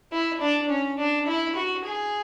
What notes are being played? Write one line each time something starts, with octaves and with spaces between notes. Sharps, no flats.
E4
D4
C#4
D4
E4
F#4
G#4